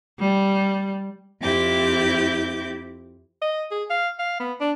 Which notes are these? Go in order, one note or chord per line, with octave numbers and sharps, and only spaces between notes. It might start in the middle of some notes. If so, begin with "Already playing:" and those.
G3
F2 C4 E4 G4 D6 G6
D#5
G#4
F5
F5
B3
D4